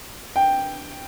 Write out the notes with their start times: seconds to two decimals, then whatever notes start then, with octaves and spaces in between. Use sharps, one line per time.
0.36 G5